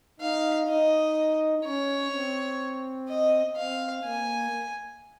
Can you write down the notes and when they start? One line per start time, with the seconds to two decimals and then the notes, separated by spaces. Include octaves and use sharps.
0.20 D#4 F5
0.68 D#4 D#5
1.65 C#4 C#5
2.13 C4
3.08 D#5
3.56 C4 F5
4.04 A#3 G#5